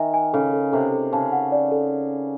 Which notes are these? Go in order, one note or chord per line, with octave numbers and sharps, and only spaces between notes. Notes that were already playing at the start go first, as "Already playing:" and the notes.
Already playing: D#3 E5 G#5
G#5
C#3 A4
A4
C3 A4
A4
C#3 A5
F#5
D5
A4